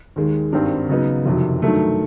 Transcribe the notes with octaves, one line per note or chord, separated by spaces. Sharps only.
D#2 D#3 G#3
G#1 G2 D#3 G3 C4
C#3 F#3 B3 D#4
F#1 F2 C3 D#3 F#3
G2 D#3 F#3 A3